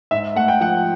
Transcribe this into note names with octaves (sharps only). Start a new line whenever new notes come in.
G#2 E5
A3 F#5
G5
F3 F#5